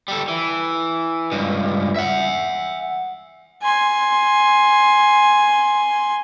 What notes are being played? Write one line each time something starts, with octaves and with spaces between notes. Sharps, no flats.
G3 A4
E3
C#2 G2
E5 F#5
G#5 C6